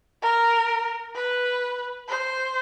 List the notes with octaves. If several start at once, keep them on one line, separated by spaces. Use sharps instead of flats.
A#4
B4
C5